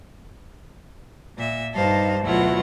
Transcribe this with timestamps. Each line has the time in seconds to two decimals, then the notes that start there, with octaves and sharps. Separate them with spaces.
1.37 A#2 E5
1.74 G2 D#4 C5 F5 A5
2.23 D2 B2 F#3 E4 F4 F#5